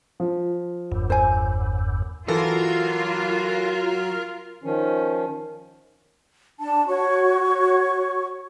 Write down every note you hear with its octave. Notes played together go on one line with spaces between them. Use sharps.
F3
F#1 E2 G2
C5 G#5
E3 F#3 F4 F#4 A4 A#4
D#3 F3 C#4
D4 A5
F#4 C#5 C#6